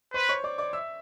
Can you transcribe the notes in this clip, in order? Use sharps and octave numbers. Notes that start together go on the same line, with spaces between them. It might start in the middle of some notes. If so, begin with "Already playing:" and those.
B4 C5 C6
C#5 C#6
D5 D6
D5 D6
E5 E6